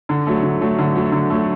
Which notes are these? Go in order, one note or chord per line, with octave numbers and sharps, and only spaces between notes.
D3
F#3 A3
D3
F#3 A3
D3
F#3 A3
D3
F#3 A3